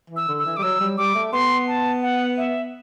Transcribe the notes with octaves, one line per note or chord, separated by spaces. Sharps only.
E3
E6
D3
E6
E3
G3 D6
F#3 E6
G3
G3 D6
A3
B3 C6
A5
F#5
E5